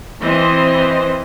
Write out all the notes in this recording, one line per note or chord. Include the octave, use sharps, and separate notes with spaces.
E3 C4 C5 D#5